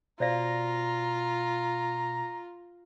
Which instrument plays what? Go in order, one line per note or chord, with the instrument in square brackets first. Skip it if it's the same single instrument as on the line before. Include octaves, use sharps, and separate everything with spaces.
[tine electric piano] B2 A#6 [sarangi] F4 [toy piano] C5 D5 F5 [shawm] A#5